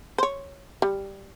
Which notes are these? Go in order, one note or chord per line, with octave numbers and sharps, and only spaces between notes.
C5 C#5
G3